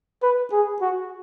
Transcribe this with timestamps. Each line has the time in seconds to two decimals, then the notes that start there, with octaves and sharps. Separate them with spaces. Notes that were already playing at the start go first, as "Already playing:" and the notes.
0.23 B4
0.52 G#4
0.81 F#4